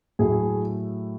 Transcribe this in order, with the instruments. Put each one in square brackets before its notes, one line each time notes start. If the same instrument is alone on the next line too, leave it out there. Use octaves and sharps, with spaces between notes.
[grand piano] A2 F#3 A3 G#4